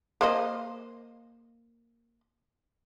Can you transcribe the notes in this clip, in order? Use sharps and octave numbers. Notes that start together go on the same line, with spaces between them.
A#3 C5 D#5